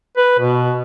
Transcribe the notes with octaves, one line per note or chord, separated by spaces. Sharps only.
B4
B2